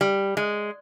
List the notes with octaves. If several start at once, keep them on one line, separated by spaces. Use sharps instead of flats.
G3
G#3